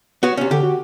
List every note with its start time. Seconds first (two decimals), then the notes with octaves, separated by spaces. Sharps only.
0.23 B3 F#4 C#5
0.37 C3 C#4
0.51 D3 G4
0.63 F#4